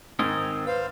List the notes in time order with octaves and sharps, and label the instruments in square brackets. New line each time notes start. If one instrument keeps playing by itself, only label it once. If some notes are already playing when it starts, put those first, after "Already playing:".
[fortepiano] G#2 [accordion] D#3 [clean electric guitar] C4 A#4 D#5 [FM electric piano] D#6 G#6
[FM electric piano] B4 [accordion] C5 F5